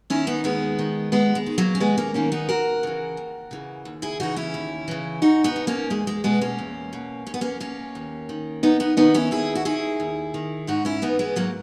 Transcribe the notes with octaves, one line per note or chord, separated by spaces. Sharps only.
D#3 C#4 E4
B3 D#4
D#2 G#3 B3
D#3
D#2 G#3 B3
G#3
D#3
F#3 A#3
C#4
D#2 G#3 B3
A#3 C#4
D#3 A#3 C#4
B3 D#4
D#2 F#4 A#4
C#3 E3
D#2
C#3 E3
D#2
E4 G#4
C#3 E3 D#4 F#4
C#4 E4
D#2
C#3 E3
E2 D#4 F#4
B3 D#4
B2
A#3 C#4
E2 G#3
G#3
B2 G#3 B3
A#3 C#4
E2
B2
E2 C#4
B3
A#3 C#4
B2 A#3 C#4
D#2
D#3
D#2 B3 D#4
B3 D#4
D#3 B3 D#4
C#4 E4
D#2 E4 G#4
F#4
D#3 E4 G#4
D#2
D#3
G#2 D#4 F#4
C#4 E4
E3 B3 D#4
G#3 B3
G#2 F#3 A#3